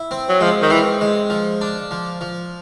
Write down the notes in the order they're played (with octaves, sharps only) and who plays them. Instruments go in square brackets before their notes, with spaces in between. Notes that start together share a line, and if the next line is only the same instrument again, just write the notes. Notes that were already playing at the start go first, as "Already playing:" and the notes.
Already playing: [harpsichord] E4
C4
[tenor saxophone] F#3
[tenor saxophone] F3 [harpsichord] G#3
[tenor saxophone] D#3
[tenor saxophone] E3 [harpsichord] C4
[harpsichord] G#3
F3
D4
F3
F3